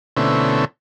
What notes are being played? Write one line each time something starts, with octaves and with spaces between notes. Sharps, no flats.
B2 D3 A3 C4 C#4 E4